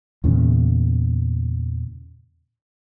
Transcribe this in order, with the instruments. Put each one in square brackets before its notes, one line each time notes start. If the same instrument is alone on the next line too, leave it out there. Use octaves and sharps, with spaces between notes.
[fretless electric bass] E2 A#2 C#3